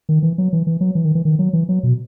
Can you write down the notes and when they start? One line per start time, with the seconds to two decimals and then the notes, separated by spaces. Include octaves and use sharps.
0.09 D#3
0.23 E3
0.38 F#3
0.53 E3
0.67 E3
0.81 F#3
0.95 E3
1.05 D#3
1.15 E3
1.25 D#3
1.39 F#3
1.53 E3
1.69 F#3
1.83 B2